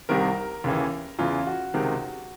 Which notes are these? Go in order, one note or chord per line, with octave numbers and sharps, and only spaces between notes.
C2 C3 D#3 A#4
D#2 C#3 E3
E2 C#3 E3 F4
F#4
C#2 C3 D#3